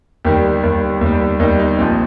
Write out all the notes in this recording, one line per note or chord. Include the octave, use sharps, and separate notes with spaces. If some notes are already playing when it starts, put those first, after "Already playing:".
D#2 D#3 G3 G4
D#2 D#3 G3
D#2 D#3 G3
D#2 D#3 G3 D#4
D#4
A#1 A#2 F3 C4